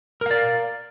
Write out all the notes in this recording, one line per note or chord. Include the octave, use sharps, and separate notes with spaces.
A#4 D5 F5